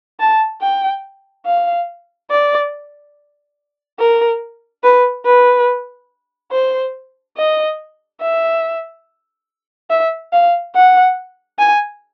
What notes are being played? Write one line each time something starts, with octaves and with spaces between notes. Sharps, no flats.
A5
G5
F5
D5
A#4
B4
B4
C5
D#5
E5
E5
F5
F#5
G#5